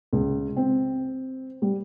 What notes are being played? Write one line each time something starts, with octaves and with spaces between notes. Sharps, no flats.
C#2
C4
G3